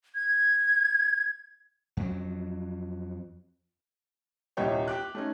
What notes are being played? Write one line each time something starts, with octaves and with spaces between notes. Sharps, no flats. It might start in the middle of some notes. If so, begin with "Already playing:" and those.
G#6
F2 F#3
D#1 C2 G4 C#5 D#5 G5
G4 D6 F#6
A3 C#4 D#4